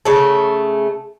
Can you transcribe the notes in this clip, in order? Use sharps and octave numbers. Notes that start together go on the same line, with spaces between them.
C#3 A3